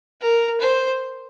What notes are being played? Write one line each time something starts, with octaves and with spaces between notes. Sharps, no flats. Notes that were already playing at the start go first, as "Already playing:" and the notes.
A#4
C5